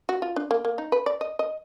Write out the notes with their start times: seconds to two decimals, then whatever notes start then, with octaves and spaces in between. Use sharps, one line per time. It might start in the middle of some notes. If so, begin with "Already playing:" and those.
0.09 F#4
0.22 F4
0.36 D4
0.51 A#3
0.65 A#3
0.78 D#4
0.92 B4
1.06 D5
1.21 D#5
1.39 D#5